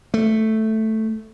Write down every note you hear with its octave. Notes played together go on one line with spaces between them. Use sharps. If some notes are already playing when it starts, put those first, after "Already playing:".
A3